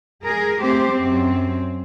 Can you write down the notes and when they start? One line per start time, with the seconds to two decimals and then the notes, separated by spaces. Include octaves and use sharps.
0.24 G#3 G#4 A#4
0.62 A3 C4 G4 C5
0.92 F#2 C4